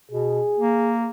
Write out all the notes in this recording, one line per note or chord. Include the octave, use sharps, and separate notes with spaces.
B2 G#4
A#3